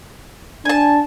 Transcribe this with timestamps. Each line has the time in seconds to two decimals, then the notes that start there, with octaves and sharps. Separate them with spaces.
0.65 D4 G#5 A5